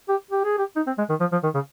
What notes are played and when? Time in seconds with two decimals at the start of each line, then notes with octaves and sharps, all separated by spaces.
0.09 G4
0.31 G4
0.44 G#4
0.58 G4
0.76 D#4
0.87 C4
0.98 G#3
1.09 D#3
1.20 F3
1.32 F3
1.43 D#3
1.55 C#3